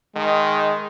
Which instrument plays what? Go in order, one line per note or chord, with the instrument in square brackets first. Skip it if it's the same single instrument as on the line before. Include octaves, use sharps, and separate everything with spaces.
[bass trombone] D#3 [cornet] G#3